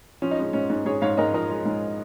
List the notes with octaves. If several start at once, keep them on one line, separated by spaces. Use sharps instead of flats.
F3 C#4
D#4
G#3 C#4
G#2 C#4
G#2
G#2 G#4 C#5
G#2 C#5 F5
G#2 A#4 D#5
F3 A#4 D#5
G#3
G#2